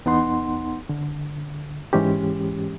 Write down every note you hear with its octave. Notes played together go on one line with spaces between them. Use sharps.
E2 B3 D#4 F#5 C6
D3
G#2 E3 G#3 C#4 G4